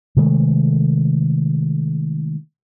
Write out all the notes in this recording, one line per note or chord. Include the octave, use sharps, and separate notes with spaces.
C3 D#3 G#3 A3